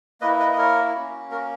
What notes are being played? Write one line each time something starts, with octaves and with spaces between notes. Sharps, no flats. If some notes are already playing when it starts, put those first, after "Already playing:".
A#3 E4 B4 D#5
B4 D#5
D#5
A#4 C#5
A#3 C#4 F#4
F#4 A#4